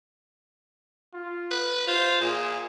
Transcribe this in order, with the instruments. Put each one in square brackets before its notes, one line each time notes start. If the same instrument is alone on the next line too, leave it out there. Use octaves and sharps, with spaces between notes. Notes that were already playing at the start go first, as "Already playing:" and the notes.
[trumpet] F4
[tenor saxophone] B4
[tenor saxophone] F4 [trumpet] C5
[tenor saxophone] A#2 [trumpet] G#4